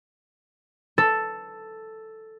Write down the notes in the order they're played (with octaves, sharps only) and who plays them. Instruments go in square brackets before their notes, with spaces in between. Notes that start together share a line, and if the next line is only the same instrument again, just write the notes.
[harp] A4